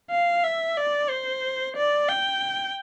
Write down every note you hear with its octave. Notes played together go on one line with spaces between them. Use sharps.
F5
E5
D5
C5
D5
G5